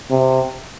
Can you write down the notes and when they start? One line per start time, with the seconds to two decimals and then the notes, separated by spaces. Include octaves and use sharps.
0.10 C3